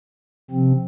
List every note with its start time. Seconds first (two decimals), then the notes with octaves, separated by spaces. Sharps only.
0.50 C3 F3 C4